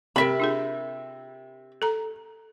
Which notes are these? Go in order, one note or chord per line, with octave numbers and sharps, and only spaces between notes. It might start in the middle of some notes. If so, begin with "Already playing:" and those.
C3 A#4 E5 B5
D4 F4 G#4
A4 A#5